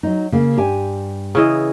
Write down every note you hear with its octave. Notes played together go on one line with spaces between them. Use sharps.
F#3 D#4
C#3 A#3
G2 G4 G#5
C#3 E3 D#5